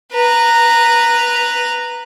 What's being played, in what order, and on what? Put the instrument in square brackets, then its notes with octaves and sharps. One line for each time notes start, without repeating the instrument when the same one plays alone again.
[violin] B4 A#5